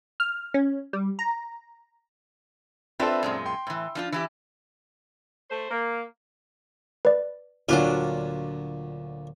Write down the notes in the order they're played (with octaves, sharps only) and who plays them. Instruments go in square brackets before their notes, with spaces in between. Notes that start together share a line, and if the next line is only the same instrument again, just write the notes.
[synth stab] F6
C#4
G3
A#5
[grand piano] C4 D4 A4 [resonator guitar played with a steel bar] F4 B4 E5
[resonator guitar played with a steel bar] F#2 A#2 G#3
[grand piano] G5 C6
[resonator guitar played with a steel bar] A2 E3
F3 D4 F4
E3 E4 G4
[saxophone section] A3 C5
A#3
[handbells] B4 D5
[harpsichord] D2 A#2 G#5 [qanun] F#3 D4 F4